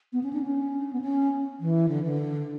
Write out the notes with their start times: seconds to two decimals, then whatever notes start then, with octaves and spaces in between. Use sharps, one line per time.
0.13 B3
0.23 C#4
0.33 D4
0.42 C#4
0.93 B3
1.01 C#4
1.60 E3
1.88 D3
2.04 D3